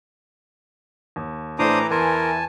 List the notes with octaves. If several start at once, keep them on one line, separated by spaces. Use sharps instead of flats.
D#2
A2 E3 D4 A4 C5 A#5 D6 D#6
E2 A#4 G#5 A5 C6